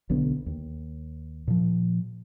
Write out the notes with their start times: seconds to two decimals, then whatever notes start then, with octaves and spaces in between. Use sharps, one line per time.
0.10 B1 D3 B3
0.46 D#2
1.47 A#2 F3